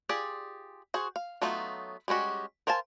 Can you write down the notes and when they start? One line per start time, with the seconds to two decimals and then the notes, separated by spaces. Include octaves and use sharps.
0.09 F4 G4 G#4 D5
0.94 F#4 G#4 C5
1.16 F5
1.42 F#3 A3 B3 D#4 F4
2.08 G3 G#3 C#4 F#4 G4
2.67 A#4 C5 F5 G#5 A5